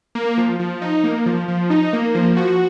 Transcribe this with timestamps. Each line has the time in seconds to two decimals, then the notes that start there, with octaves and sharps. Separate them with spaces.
0.15 A#3
0.37 F3
0.60 F3
0.82 D#4
1.04 A#3
1.26 F3
1.48 F3
1.70 D#4
1.93 A#3
2.15 F3
2.37 F#4